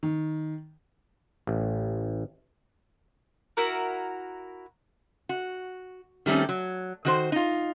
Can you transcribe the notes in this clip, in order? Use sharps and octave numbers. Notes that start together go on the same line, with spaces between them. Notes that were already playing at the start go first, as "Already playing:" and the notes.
D#3
A1
E4 F#4 A#4
F#4
D#3 G3 A3 C4 C#4
F#3
D#3 F#4 C5
D#4 F4